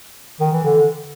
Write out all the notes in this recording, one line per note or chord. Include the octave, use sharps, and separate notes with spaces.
D#3
E3
D3